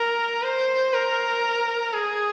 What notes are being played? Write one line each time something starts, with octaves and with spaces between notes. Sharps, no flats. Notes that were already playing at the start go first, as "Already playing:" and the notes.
Already playing: A#4
C5
A#4
G#4